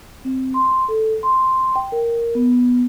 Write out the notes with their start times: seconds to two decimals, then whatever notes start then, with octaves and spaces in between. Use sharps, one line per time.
0.25 C4
0.54 C6
0.88 A4
1.23 C6
1.76 G5
1.92 A#4
2.35 B3